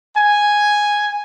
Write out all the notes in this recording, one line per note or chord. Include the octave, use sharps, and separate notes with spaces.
G#5